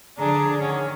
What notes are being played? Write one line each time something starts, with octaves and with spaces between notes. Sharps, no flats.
D3 F3 D4 G#4 A#5
D#3 C#4 F#5